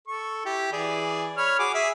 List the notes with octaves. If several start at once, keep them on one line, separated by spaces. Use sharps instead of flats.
A4 C#6
E4 G4
E3 G#4 D5
C#5 B5 F6
F#4 G#4 D6
G#4 E5